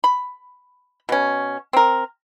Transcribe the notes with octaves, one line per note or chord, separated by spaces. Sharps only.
B5
B2 C#4
C4 A#4